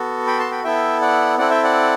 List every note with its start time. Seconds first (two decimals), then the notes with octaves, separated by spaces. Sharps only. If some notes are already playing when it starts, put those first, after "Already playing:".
Already playing: B3 F#4 A4
0.27 G5 B5
0.39 A5 C6
0.51 G5 B5
0.64 B3 E4 A4 E5 G5
1.01 D5 F#5
1.38 C4 E4 A4 D5 F#5
1.51 E5 G5
1.63 D5 F#5